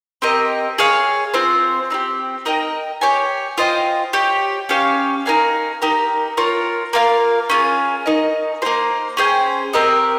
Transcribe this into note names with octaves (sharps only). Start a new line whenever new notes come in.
C4 G4 A#4 D#5
G#4 C#5 F5
C4 F4 C5
C4 D#4 G4
D#4 A#4 D#5 G5
G4 C#5 G#5
F4 C5 D#5 G5
G4 C#5 G5
C#4 G4 C#5 F5
D#4 A#4 F5 G#5
D#4 G4 A#4
F4 A#4 C#5
A#3 F4 A#4 F5
C#4 F4 G#4
D#4 A#4 D#5
A#3 D#4 G4 C5
C#4 G#4 C5 G5
C4 G4 A#4 D#5